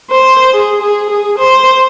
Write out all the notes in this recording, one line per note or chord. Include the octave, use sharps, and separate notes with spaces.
C5
G#4
G#4
G#4
C5